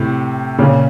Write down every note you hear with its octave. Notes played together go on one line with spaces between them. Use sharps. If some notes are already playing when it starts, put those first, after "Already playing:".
Already playing: A2 C3
A#2 C#3